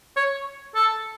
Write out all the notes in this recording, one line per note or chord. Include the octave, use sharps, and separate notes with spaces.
C#5
A4